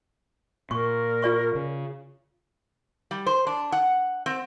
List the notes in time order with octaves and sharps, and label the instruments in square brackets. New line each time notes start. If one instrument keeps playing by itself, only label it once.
[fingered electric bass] A#2 [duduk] A#4 [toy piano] C#6
[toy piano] F4 D5 C#6
[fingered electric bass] C#3
[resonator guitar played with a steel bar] G3
C5
D4
F#5
C4